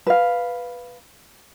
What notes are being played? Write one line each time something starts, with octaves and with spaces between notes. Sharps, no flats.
B4 F5